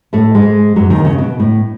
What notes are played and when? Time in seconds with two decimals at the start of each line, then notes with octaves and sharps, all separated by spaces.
0.13 A2 A3
0.35 G#2 G#3
0.76 F#2 F#3
0.90 D#2 D#3
1.05 C#3
1.18 B2
1.40 A2